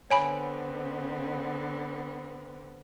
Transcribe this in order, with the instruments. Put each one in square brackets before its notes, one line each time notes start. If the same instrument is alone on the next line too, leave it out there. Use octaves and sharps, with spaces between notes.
[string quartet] D3 B3 C4 [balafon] C#5 G#5 B5